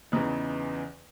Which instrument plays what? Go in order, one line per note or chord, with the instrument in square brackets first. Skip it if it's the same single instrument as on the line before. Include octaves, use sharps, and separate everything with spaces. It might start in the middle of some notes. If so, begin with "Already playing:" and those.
[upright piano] E2 C#3 E3 B3 D#4